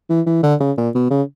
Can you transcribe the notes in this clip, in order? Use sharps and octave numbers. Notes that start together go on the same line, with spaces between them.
E3
E3
D3
C#3
A#2
B2
C#3